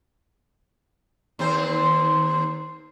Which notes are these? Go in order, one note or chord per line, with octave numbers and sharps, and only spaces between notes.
D#2 C4 C5